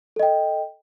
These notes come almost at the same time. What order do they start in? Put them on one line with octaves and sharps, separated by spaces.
A4 D#5 G5